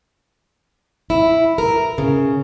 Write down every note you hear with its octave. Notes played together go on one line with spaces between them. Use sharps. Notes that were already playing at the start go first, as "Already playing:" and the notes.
E4
A#4
C#3